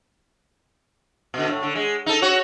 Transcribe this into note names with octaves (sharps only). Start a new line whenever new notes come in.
B2 D3
A2
D3
G#3
D#4 A4
F#4 C#5